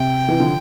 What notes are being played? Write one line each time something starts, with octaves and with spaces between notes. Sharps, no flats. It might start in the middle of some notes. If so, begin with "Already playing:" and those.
Already playing: C3 G5
C3 E3
D3 F3